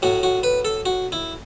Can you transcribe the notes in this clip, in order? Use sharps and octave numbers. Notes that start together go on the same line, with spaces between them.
A2 F#3 F#4
F#4
B4
A4
F#4
E4